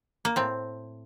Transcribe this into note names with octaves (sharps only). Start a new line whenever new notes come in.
A#3
A2 C4